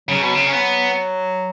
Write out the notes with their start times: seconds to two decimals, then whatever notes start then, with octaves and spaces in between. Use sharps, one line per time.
0.09 C#3 F#3
0.22 B2
0.35 C#3
0.47 C#4
0.53 B3